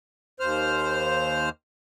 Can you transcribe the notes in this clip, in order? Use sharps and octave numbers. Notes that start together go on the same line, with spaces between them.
D#2 C5 F6